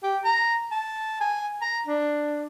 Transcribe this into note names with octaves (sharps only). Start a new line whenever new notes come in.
G4
A#5
A5
G#5
A#5
D4